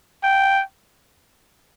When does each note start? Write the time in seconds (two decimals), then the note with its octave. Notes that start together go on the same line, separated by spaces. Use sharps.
0.23 G5